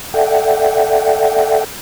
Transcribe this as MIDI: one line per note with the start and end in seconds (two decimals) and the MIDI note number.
0.14 1.64 69
0.14 1.64 74
0.14 1.64 76
0.14 1.64 78
0.14 1.64 79